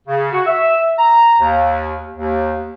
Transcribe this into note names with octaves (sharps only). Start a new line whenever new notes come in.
C#3
F#4
E5
A#5
D#2
D#2